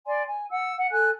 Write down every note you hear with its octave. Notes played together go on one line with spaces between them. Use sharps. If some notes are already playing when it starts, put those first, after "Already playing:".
D5 G#5 C6
G#5
F#5 E6
F#5
A4 G#5 F#6